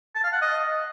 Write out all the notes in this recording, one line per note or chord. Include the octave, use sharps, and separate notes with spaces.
A5
F5
F#5
D#5